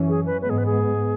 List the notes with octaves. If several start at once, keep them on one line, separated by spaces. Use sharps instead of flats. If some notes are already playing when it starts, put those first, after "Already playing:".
Already playing: F#2 E3 C#4
G#4
B4
G#2 G#3 B3 B4
G#4
B4
G#4